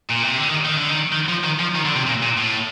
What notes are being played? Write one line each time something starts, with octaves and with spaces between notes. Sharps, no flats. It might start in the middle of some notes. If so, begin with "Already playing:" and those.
A#2
C3
D3
D#3
D#3
D3
D#3
D#3
F3
D#3
F3
D#3
D3
C3
A#2
A#2
A2